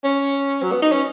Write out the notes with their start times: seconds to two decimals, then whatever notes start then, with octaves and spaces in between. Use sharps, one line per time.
0.04 C#4
0.63 F#3
0.72 B3
0.82 D#4
0.92 C#4